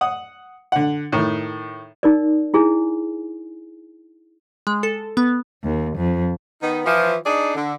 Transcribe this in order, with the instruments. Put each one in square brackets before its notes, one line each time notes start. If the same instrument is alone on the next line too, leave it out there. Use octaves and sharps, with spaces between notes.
[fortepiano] F#5 D#6
D3 F#5
A2 D#3
[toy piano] D#4 A#4 D5
E4 G#4 G#5
[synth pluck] G#3
A4
B3
[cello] D#2
F2
[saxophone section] D#3 B3 D#4
E3 F3
D4 D#4 G#4 D5
D3